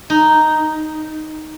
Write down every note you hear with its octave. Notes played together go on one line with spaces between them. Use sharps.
D#4